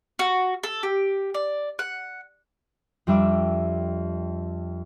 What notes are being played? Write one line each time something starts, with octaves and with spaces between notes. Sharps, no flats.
F#4
A4
G4
D5
F#5
F2 G3 D4 E5 D6 E7